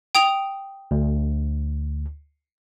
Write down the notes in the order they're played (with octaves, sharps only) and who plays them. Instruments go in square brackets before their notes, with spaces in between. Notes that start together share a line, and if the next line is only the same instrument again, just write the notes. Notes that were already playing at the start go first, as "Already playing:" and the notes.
[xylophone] G5 D#6 F7
[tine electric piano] D2